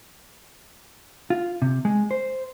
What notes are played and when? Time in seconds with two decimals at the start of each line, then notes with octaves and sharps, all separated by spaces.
1.30 F4
1.62 C3
1.85 G#3
2.11 C5